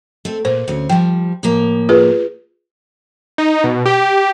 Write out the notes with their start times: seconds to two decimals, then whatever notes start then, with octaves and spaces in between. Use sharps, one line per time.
0.25 A3 C4
0.45 A#2 C5
0.68 D2 C4 C#4
0.89 F3 G3 G5
1.43 A2 F3 A#3
1.89 F4 G#4 B4
3.38 D#4
3.64 B2
3.86 G4